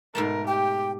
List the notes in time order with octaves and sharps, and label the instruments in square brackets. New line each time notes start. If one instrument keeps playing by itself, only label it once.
[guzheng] G#2 B2 A3 [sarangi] A#4
[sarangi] G4 [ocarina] G5